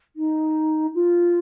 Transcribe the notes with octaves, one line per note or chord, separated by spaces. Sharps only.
D#4
F4